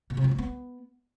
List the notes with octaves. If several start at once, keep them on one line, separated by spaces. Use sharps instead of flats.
A#2
C3
E3
F#3
B3